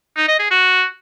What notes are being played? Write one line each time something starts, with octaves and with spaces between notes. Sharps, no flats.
D#4
D#5
G#4
F#4